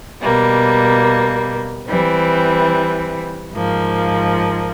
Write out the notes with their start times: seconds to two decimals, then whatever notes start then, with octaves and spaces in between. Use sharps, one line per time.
0.22 B2 G3 A#3
1.87 E3 G3 C4
3.53 G#2 F3 A#3